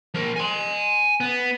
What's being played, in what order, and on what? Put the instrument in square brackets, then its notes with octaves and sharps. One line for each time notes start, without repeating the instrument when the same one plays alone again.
[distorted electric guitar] F3 A#4
G#5 C6
B3